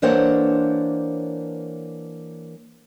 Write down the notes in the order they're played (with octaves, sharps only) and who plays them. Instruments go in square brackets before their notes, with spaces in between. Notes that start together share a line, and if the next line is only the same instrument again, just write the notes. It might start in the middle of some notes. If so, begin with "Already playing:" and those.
[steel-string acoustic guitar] E3 A#3 D4 C5 C#5 F#5